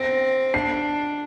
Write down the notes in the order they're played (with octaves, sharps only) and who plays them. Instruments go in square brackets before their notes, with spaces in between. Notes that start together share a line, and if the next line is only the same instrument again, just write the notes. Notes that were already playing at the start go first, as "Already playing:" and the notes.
Already playing: [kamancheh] C4 [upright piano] A#6
[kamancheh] D4 [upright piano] C7